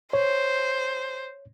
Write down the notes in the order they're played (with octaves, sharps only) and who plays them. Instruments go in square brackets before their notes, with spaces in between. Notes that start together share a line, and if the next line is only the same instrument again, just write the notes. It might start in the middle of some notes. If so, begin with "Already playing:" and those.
[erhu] C5 [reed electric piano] C#5